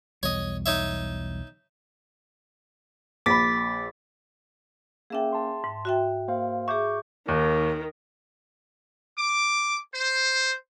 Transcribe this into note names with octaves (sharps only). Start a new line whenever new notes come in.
B1 E2 G3 C#5 D#5
D#4 C#5 E5
A#1 B5 D6 A6 B6
A#3 C#4 G#4 E5 G5
A5 C6
G#2
F#4 E5 G5
A#3 C5 F5
G#4 E5 C#6 D6 G6
D#2 D#3
D6
C5